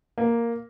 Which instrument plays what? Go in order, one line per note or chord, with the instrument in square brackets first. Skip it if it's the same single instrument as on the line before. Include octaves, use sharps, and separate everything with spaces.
[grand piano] A#3